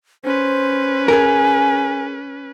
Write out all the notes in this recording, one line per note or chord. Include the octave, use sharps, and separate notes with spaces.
C#4 B4 C5
G#4 A#4 G#5